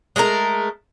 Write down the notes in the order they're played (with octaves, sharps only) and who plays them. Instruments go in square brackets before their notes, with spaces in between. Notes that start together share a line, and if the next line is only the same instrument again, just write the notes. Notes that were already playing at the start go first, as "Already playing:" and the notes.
[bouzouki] G#3 A3 G4 A#4